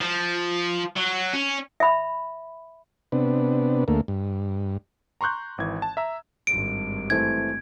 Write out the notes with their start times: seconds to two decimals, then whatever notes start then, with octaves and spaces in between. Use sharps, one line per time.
0.01 F3
0.96 F#3
1.33 C#4
1.80 E5 B5
3.12 C3 B3 D4
3.88 D2 A3 A#3
4.08 G2
5.21 A#5 C6 C#6 F#6 G6
5.58 G#1 E3 G#6
5.82 A5
5.97 E5 A#5 E6
6.47 G#1 G2 D7
7.10 E3 A3 C4 G#6